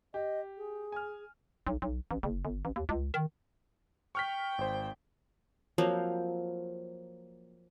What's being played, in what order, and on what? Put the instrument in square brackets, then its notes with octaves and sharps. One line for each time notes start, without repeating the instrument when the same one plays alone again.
[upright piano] G4 [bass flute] D#5
[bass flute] G#4
[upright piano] G#5 F6
[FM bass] B1
B1
A1
F#1
G1
A1
D#2
C#2
D#3
[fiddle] G5 [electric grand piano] C#6 F6 B6
[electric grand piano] G#1 C5
[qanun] F3 F#3 A#3 C4